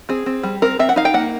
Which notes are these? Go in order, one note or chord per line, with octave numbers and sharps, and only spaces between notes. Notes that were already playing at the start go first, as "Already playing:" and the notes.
C4 G#4
C4
G3
C4 A#4
C4 E5
F#5
D#4 F5
G5
A#3 F#5